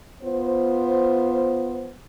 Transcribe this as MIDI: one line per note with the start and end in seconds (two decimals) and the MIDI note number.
0.23 1.92 59
0.23 1.92 65
0.23 1.92 72